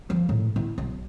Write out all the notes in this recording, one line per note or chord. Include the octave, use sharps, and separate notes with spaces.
F3
A2
E4
B1